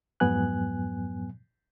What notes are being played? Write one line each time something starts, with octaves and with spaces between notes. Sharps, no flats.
F2 G#2 F#3 B3 G#5 F#6